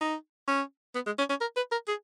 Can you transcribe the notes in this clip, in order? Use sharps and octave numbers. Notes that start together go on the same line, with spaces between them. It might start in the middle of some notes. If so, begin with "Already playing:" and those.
D#4
C#4
B3
G#3
C#4
C#4
A#4
B4
A#4
G#4